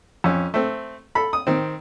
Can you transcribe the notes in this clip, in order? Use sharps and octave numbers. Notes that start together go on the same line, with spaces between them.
F2 C#4
A3 C4
A4 B5
D#6
D#3 C4